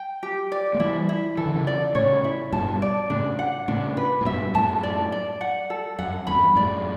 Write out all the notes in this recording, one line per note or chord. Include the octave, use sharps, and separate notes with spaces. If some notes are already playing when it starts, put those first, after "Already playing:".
Already playing: G5
G4
D5
A3
E3 G3 E4
E4
E3 A4
D3
C#3 E3
D5
A2 C#3 C#5
E4
G2 B2 A5
D5
A2 C#3 D4
F#5
A2 C#3 D4
B4
A2
G2 B2 E5
F#2 A2 A5
D5
D5
F#5
A4
F#2 F#5
E2 G2 B5
F#2 A2 D5